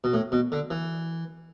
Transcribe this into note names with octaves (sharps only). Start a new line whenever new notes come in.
B2
A2
B2
D3
E3